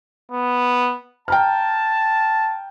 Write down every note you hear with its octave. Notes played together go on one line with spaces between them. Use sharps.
B3
G5 A5 A#5 F6